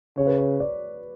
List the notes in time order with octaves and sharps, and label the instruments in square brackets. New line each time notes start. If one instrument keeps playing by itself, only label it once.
[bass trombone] C#3 [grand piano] C#5
[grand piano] B4
C#5
D5